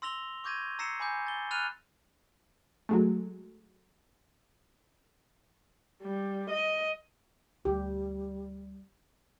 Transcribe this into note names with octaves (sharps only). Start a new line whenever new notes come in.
C6 E6 A#6 F7 G7
C#6 D6 G6 G#6 A#6 D#7
A#5 E6 A#6 C7 C#7 E7
G#5 B5 D6 G6
A6 G7
B5 F6 F#6 A6 D#7 F7
F#3 G#3 A3
G3
D#5
D2 G3 G4